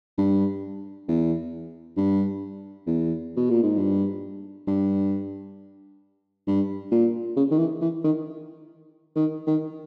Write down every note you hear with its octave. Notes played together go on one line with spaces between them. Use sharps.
G2
E2
G2
E2
B2
A#2
G#2
G2
G2
G2
A#2
C#3
D#3
E3
E3
D#3
D#3
D#3